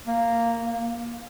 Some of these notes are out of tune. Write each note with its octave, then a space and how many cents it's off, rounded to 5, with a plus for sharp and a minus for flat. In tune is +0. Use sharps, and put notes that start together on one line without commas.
A#3 -10
A#3 +20